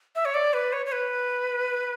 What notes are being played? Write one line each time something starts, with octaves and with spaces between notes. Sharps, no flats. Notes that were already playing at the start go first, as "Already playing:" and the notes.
E5
C#5
D5
B4
C#5
C#5
B4